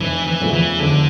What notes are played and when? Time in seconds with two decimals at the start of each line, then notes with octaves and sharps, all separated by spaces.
0.01 F1 E3
0.27 E3
0.40 E2 C#3 F3 A3
0.53 E3
0.80 F1 D3